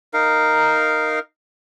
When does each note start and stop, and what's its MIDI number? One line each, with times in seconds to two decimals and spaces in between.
0.13 1.19 63
0.13 1.19 70
0.13 1.19 77